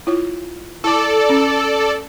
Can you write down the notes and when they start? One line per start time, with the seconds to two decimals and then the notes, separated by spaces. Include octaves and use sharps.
0.07 E4 F4 C#5
0.84 E4 A4 D5 D6
1.30 C#4